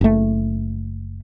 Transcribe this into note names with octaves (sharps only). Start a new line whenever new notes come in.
F#1 A3